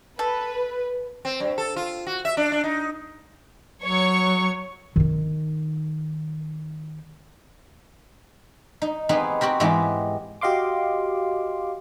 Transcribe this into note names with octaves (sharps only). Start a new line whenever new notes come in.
A4 B4
C4
G2
A4
F4
F#4
E5
D4
D4
D#4
F#3 C#5 C#6
D#3 D#4
D#4
B3 C4 D#4 G4 G#4 B4
C4 F#4 G4 A#4
G#2 E3 G#3 B3 C4 G4
F#4 G4 D#5 F5 C6 D6